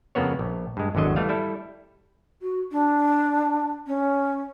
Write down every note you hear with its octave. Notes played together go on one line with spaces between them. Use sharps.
F2 C#3 A#3 B3 C#5
A#1
G2 G#3
G#1 E2 D3 F#3 D#5
E3 G3 A3 F5
G3 E4 A4
F#4
D4
C#4